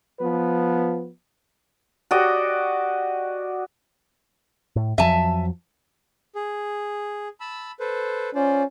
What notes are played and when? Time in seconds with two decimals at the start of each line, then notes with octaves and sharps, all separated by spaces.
0.20 F3 B3 B4
2.11 F#4 G4 D5 D#5
4.76 A2
4.98 F2 F3 F#3 E5 G#5 A5
6.35 G#4
7.40 A5 B5 E6
7.80 A4 B4 C5
8.35 C#4 F4 C5 D5